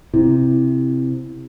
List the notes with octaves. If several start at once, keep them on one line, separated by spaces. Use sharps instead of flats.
C3 E4